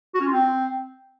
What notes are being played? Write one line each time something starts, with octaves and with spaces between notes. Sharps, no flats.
F#4
C#4
F4
C4